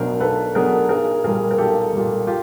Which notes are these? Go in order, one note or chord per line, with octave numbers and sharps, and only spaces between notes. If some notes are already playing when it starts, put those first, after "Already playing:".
Already playing: B1 B2 F#3 B3 D4 A#4 C5
B1 A4 B4
B2 F#3 B3 D4 G#4 A#4
B1 G#4 A#4
A#2 G3 G#4 A#4
A#4
B1 G4 A4
A#2 G3
F4 G4